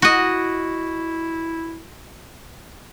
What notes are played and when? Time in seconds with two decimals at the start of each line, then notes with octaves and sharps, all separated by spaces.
0.02 E4 F#4 D#5